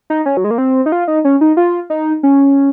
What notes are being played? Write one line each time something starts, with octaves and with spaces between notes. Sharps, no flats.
D#4
C#4
F#3
G#3
A#3
C4
D#4
F4
D#4
C#4
D#4
F4
D#4
C#4